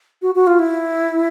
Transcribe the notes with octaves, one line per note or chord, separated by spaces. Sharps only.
F#4
F#4
F4
E4